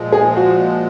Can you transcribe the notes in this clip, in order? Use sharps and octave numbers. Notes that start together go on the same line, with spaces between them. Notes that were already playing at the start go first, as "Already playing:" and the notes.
Already playing: A#2 F3 G#3
G#4
F#4